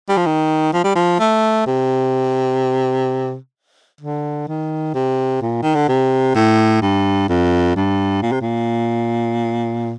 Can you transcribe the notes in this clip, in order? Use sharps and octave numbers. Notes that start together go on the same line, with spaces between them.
G3
F3
D#3
F3
G3
F3
A3
C3
D3
D#3
C3
A#2
D#3
D3
C3
A2
G2
F2
G2
A#2
C3
A#2